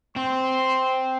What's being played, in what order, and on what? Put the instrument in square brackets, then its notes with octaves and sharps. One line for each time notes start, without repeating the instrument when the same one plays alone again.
[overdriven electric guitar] C4 [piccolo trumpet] C6